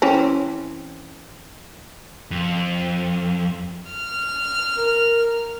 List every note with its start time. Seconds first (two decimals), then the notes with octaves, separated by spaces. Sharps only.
0.02 E3 C4 C#4
2.31 F2
3.91 F6
4.78 A#4